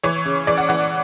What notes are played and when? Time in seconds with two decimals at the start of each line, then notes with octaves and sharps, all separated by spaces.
0.03 E3 C#5
0.26 C#3
0.47 E3 D5
0.58 F#5
0.69 E3 F#5